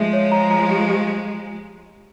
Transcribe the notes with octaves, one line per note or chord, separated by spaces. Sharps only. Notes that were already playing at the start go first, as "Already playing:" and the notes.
Already playing: F3 G#3 G#4 E5
C#5
A#5
A#5
G4
G4